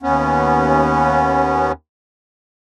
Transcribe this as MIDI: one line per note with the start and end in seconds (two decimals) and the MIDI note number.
0.03 1.72 39
0.03 1.72 59
0.03 1.72 61